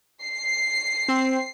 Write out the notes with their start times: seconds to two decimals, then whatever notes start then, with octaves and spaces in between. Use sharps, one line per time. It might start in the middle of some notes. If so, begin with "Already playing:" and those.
0.24 C7
1.08 C4